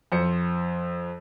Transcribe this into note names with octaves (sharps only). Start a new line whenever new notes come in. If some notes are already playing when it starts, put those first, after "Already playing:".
F2 C5 C#7